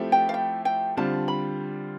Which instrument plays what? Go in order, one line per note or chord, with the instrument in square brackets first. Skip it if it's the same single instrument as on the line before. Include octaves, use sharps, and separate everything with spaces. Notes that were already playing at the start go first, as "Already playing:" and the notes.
Already playing: [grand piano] F3 A3 C4 E4 G4
[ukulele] G5
F5
G5
G5
[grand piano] D3 G3 C4 F4 [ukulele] A5
[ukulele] B5